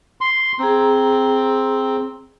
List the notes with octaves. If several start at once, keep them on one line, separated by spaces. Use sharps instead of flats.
C6
C4 G#4 A#5